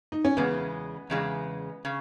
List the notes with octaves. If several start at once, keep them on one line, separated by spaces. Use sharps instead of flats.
D#4
C#4
E2 C#3 G#3 B3
E2 C#3 G#3
C#3